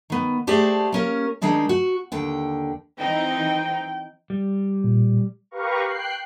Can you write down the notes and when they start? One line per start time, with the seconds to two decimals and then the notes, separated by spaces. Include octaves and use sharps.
0.10 D#3 B3
0.47 A3 G4 G#4 C5 D5 A5
0.92 A#3 C#4 A#4
1.41 D#3 G#3 C4 D4 D#4
1.69 F#4
2.12 D#2 D3 G5
2.99 E3 C4 D#4 G5
4.30 G3
4.84 A#2
5.51 G4 A#4 B4 F5 A#5 C#6
5.82 G5 F#6 C7